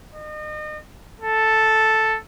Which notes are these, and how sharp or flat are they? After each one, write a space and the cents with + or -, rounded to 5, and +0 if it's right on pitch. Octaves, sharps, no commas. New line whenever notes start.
D#5 -35
A4 +0